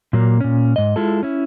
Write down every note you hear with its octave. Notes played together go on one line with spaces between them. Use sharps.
A#2 F#3 A#3
A#2 C#4
G#2 D#5
G#3 E4 F4 A4
C#4 E4